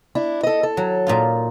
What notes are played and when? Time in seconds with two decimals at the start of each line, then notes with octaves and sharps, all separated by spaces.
0.15 D4 E4
0.43 A4 D#5
0.63 A4
0.77 F#3
1.07 A#2 D#4 F4